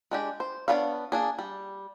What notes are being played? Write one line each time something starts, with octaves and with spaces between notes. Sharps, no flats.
G#3 D4 G4
C5
B3 D4 B4 C#5 F5
A#3 D4 G#4
G3